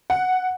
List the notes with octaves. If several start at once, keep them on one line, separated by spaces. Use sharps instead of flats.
F#5